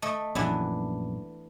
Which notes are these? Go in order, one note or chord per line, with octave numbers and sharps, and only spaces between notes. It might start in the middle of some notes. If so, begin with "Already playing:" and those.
A3 D#5
A#1 F#2 E3 B3 D4